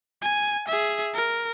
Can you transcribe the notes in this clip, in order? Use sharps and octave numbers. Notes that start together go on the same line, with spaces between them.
G#5
G#4 E5
A#4